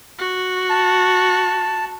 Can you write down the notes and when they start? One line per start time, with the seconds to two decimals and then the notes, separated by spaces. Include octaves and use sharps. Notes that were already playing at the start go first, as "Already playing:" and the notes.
0.19 F#4
0.70 A5